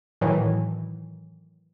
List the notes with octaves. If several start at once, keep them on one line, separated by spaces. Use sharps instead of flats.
A2 D#3 E3 F#3